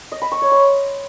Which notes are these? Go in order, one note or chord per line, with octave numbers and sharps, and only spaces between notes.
D#5
B5
C#6
C#5
C6